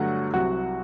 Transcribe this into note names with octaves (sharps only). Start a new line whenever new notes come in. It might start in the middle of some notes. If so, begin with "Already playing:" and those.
Already playing: G2 D3 F#3 A3 F#4 F#5
C2 C3 F#3 F#4 F#5